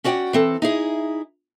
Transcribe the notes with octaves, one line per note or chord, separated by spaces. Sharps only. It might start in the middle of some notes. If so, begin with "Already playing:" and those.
C#4 F#4 D5 F#5 G5
E3 C4 A4
D#4 E4 G#4